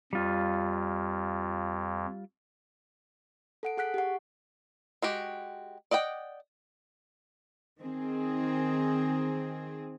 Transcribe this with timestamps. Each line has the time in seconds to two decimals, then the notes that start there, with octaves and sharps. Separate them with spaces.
0.13 F2 G3 F4
3.63 A4 F#5 D7
3.77 G#4 F#5 F#6 B6 D7
3.94 G4 F#5
5.02 G#3 F#4 G4
5.91 D5 D#5 F#5 G5
7.80 D#3 C4 G#4